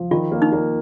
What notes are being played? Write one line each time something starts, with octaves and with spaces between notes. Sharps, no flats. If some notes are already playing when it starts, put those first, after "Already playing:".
Already playing: F3
D#3 F4
A#3
D#4
A#3